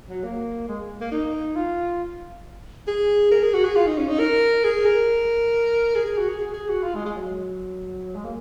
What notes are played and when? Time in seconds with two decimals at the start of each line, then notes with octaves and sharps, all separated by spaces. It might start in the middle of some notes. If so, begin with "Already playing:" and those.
0.09 F#3
0.24 A#3
0.68 G#3
1.01 A#3
1.11 D#4
1.55 F4
2.87 G#4
3.32 A#4
3.43 G#4
3.54 F#4
3.64 G#4
3.76 F4
3.87 D#4
3.98 C#4
4.09 D#4
4.19 A#4
4.64 G#4
4.85 A#4
5.95 G#4
6.06 G#4
6.18 F#4
6.29 G#4
6.39 G#4
6.54 G#4
6.69 F#4
6.83 F4
6.95 G#3
7.05 G#3
7.16 F#3
8.15 G#3
8.25 A#3